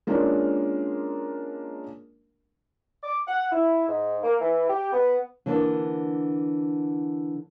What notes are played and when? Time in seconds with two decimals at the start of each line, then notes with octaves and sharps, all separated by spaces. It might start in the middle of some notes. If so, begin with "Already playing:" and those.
0.07 G#3 A#3 C#4 D4 F4 A#4
3.03 D6
3.27 F#5
3.51 E4
3.88 G#2
4.23 A#3
4.40 E3
4.69 G4
4.92 B3
5.46 D3 E3 A#3 D4